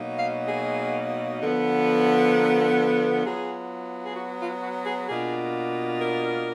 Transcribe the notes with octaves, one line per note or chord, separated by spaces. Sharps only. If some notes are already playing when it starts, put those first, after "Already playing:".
Already playing: B2 F#3 A#3 D#4
F5
G#4
D3 F3 B3
A#4
F#3 B3 F4 G#4
G#4
F#4
F4
F#4
G#4
B2 A#3 D4 F4 G#4
A#4